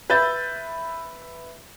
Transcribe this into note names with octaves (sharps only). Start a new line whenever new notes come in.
B4 E5 E6 G6 A6